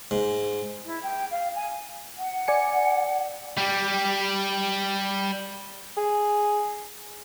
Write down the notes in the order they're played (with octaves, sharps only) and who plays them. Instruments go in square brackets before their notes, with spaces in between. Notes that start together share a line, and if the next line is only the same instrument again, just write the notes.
[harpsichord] G#2
[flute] E4
G5
F5
G#5
[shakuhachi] F#5
[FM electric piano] D5 G#5 C#7
[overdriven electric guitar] G3 G4
[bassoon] G#4